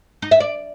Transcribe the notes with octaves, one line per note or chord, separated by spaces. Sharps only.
D#4
E5
D5